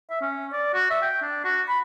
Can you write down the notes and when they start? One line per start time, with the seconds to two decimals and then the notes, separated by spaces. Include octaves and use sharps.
0.10 E5
0.21 C#4
0.53 D5
0.74 F#4
0.90 E5
1.02 G5
1.22 D4
1.44 F#4
1.68 B5